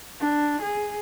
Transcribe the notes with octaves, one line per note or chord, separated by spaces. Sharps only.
D4
G#4